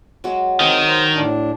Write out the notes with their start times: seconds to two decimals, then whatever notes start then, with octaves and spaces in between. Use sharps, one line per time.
0.24 F#3 G#3 F#4
0.60 D#3 C4
0.87 C5
1.15 A2 D4